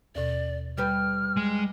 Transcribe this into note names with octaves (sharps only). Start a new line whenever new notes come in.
D#2 B2 D5
G3 G4 B4 F6
G#3